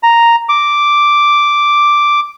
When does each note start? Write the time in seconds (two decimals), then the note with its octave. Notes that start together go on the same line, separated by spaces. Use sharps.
0.03 A#5
0.49 D6